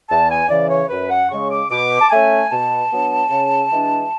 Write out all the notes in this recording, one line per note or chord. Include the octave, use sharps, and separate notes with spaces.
E2 A5
G#5
C#3 E3 D5
C#5
F#2 B4
F#5
C#3 G#3 C#6
D6
B2 D6
A5
A3 C#4 G#5
B2 A5
F#3 B3 D4
C#3
E3 G#3 D4